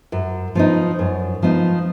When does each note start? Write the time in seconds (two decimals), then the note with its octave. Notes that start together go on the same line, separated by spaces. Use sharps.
0.12 F#2
0.55 F3 B3 D#4
0.99 F#2
1.43 F3 B3 D#4